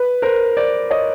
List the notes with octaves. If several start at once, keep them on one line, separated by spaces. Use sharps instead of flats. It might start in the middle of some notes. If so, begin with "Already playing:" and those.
Already playing: B4
A#4 C5
C5 D5
C#5 D#5